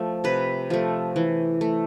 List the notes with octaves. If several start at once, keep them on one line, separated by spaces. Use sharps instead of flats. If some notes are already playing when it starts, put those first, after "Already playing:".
Already playing: F3 A3
C3 B4
F3 A3
E3
A3